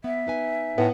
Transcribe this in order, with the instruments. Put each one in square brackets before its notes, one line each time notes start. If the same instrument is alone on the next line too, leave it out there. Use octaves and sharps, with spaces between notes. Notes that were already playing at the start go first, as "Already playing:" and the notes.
[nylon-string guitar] B3 [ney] E5
[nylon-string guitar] D#4 B4 G#5
[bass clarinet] A2 [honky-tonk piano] B3